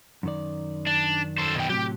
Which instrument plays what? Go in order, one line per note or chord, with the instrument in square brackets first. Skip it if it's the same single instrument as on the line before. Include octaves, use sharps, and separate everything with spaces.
[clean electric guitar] F#2 D#3 D5
[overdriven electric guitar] D4
A4 C5
B2 G5
[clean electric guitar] A2 C3 F#3 [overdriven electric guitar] G4